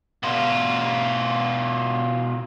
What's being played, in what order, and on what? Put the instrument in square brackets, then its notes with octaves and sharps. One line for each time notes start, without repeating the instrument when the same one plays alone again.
[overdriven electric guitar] B2 F4